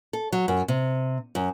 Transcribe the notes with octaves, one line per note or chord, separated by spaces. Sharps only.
A4
F#3
F#2
C3
F#2